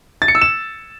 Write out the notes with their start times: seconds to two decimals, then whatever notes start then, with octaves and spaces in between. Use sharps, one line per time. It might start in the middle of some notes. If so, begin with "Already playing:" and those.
0.22 A6
0.28 C#7
0.35 E6
0.41 E7